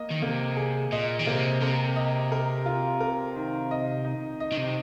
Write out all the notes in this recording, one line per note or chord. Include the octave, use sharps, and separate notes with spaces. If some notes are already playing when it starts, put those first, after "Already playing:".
Already playing: A#3 D#5
D#3
C3 A#3
G#4
A#2 D#5
D#3
C3 A#3
C3 A#4
D#5
A#4
F4
A#4
D#3
D#5
D#4
D#5
D#3
C3